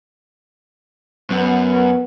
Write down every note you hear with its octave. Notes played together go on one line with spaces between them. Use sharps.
F#2 B3